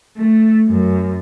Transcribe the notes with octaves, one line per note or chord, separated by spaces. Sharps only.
A3
F#2